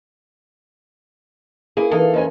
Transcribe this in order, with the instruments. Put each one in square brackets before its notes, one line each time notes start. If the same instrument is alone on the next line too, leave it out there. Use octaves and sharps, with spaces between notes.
[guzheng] A#3 [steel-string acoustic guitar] E4 G#4
[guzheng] E3 D#4 [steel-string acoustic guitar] A4 F5
[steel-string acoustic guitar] F2 C#4 G#5